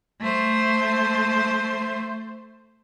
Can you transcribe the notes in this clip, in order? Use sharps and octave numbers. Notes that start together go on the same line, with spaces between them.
A3 C5